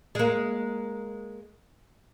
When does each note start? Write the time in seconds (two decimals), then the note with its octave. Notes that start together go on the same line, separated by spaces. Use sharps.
0.15 G#3 A#3